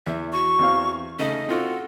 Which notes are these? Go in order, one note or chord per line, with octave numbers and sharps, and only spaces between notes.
E2 E5
F#4 C#6
E2 C4 F5
C#3 A3 C#4 D#4 D#5
C4 F4 F#4 A4